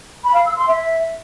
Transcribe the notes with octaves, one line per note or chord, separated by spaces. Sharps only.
B5
F5
E6
C6
E5